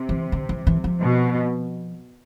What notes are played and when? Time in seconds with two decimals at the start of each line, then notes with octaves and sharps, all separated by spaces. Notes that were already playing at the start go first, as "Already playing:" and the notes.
Already playing: C3
0.09 E3
0.32 D3
0.49 E3
0.67 E3
0.84 F3
1.01 B2